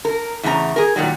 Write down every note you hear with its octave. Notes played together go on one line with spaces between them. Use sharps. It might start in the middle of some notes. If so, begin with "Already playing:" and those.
A#4
E2 A2 C#3 D#4 A#5
G#4 A#4
A#2 D#3 F#3 G3